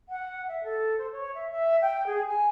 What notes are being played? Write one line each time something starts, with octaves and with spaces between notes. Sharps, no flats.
F#5
E5
A4
C5
C#5
E5
E5
G5
G#4
G#5